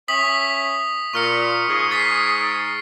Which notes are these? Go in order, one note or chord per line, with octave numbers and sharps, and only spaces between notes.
C#4 E5 D#6 B6 F#7
A#2 C#6 F6 C#7
G#2 G#4
A6 B6 C7